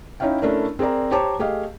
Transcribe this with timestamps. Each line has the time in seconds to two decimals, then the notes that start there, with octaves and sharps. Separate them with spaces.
0.20 C#4 D#4 E4 C#5 F5 G5
0.42 A3 C#4 D4 E4 A#4
0.79 C4 G#4 A#4 D5 A#5
1.11 G4 C5 C#5 A5 A#5 D6
1.39 A3 G4 G#4 D#5 F5